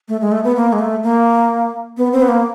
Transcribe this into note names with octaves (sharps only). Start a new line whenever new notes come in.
A3
G#3
A3
B3
A#3
G#3
A3
A#3
B3
C4
B3
A#3